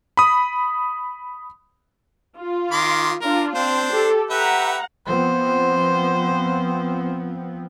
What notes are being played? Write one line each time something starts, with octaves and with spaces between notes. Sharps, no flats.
B5 D#6
F4
D#3 C6 D6
D4 F4 A#4
C4 D4 C5
G4 A4
G4 B4 E5 F#5 A#5
F3 B3 C4 C5